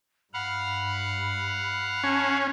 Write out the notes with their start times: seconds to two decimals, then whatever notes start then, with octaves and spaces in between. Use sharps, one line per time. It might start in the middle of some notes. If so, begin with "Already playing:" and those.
0.34 G2 F5 F#5 B5
2.04 C#4 A5